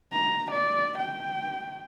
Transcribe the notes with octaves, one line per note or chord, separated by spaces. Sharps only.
A#5
D5
G5